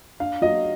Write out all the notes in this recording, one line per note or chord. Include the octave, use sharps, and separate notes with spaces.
D4 F5
F#3 D#5